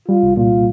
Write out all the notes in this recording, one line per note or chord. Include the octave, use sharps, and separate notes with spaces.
G3 F4
C2
A#2 F4